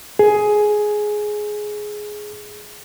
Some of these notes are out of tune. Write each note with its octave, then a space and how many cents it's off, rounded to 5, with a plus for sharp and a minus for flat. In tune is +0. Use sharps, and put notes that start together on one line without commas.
G#4 +10